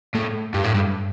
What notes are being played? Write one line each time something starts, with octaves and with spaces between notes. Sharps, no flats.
A2
G2
A2
G2